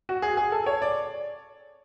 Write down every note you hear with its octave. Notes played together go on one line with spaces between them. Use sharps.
F#4
G#4
G#4
A4
C#5
D5